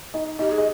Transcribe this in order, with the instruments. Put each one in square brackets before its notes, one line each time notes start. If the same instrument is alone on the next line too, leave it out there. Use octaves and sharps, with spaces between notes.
[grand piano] D#4 D#5
[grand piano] D#4 D#5 [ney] G4
[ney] G#4
[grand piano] D#5